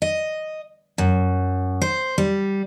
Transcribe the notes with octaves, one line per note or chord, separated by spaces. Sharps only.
D#5
F#2
C5
G3